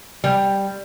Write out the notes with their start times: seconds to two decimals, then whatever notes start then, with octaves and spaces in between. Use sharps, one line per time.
0.24 G3